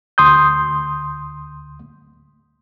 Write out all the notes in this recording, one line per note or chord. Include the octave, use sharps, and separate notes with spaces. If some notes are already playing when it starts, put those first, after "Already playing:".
D2 C6 D#6 G6